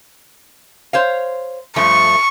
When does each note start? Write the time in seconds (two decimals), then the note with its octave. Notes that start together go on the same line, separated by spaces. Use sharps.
0.93 C5 C#5 F5
1.76 G2 F3 A3 C#6